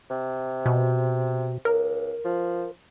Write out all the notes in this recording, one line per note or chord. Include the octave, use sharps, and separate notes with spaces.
C3
B2
C#2 A#4
F3